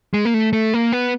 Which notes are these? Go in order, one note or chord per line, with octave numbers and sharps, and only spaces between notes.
G#3
A#3
A3
A3
A#3
B3